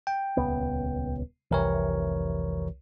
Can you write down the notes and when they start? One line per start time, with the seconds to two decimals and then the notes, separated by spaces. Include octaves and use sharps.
0.07 G5
0.37 D#1 C#2 B3
1.51 F1 C2 C3 E3 A#4 C#5